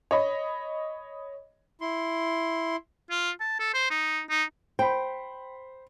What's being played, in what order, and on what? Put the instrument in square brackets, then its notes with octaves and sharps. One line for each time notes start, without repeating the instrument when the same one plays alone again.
[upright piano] C#5 D#5 B5
[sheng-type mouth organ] E4 C6
[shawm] F4
A5
A4
C5
D#4
D#4
[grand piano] C5 B5 [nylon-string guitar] G5